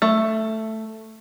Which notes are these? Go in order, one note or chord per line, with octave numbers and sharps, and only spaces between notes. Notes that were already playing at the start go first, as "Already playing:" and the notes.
A3